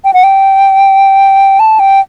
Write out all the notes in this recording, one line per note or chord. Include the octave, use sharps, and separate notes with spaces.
G5
F#5
G5
A5
G5